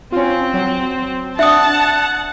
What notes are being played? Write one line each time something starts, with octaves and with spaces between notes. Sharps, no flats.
C4 C#4 F4
F#3
D4 E5 F#5 A5 D#6